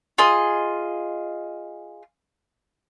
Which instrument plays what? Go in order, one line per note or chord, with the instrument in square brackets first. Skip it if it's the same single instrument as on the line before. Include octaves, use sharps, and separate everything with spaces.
[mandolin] F4 G#4 D#5